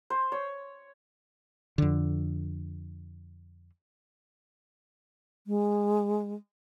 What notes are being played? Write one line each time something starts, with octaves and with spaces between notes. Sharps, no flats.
C5
C#5
F2 D3
G#3